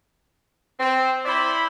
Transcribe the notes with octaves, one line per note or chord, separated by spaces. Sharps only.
C4
E4 C5 D5 E5 B5